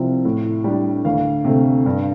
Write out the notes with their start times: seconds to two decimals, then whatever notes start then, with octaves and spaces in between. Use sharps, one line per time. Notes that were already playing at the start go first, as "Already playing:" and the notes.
Already playing: C2 C3 F3
0.25 A2
0.64 G3 D4
1.05 D2 F5
1.45 C3 A3
1.86 G2